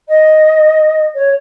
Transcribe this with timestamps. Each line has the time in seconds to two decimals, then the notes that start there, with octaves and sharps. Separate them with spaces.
0.08 D#5
1.14 C#5